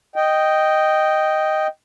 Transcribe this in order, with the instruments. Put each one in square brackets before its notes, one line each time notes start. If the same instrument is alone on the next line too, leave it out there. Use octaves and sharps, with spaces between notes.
[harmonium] D#5 G5